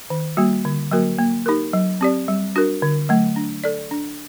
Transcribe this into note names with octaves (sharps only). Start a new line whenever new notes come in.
D#3
G3 A#3 F#4
D3
F#3 A#3 F#4 A#4
A#3
D#4 G4 A#4
F#3
C4 G4 D5
G3
D4 F#4 A#4
D3
F#3 A3
D4
A4 D5
D4